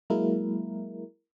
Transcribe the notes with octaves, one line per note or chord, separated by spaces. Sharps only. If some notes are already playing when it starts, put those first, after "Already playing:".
F#3 G#3 A#3 E4 A#4